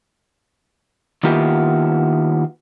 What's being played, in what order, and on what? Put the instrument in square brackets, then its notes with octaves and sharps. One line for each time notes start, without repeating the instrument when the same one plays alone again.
[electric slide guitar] D#3 A#3 B3 E4 F4 G4